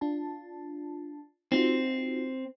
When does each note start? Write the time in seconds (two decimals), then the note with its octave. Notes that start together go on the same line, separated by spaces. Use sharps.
0.01 D4 F4 A5
1.52 C4 D#4 F4 F#4